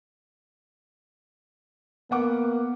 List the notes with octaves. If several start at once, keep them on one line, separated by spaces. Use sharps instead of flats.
A#3 B3 F#5 D6